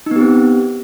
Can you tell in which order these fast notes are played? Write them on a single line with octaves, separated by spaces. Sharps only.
D#4 B3 G4 C4